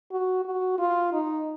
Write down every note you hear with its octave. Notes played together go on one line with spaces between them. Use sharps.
F#4
F#4
F4
D#4